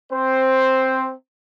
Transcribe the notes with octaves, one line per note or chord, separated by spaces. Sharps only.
C4 C5